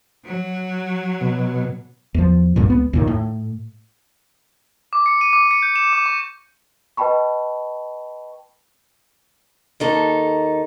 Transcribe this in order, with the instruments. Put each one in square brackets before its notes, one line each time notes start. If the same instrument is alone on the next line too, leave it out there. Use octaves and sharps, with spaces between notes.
[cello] F#3
[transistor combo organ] B2
[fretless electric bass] E2 F3
A1 D2 G2 A#2
C#2 B3
D#2 A#2 D#3
A2
[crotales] D6
C#7
D#7
D6
C#7
G6
E7
D6
C#6
[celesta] B4 D#5 G5 A5 B5 C#6
[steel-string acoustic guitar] D#2 D#4 A4